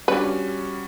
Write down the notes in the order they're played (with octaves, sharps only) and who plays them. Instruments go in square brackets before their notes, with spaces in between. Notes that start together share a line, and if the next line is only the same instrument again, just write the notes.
[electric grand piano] G3 C#4 F#4 [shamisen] D4 B4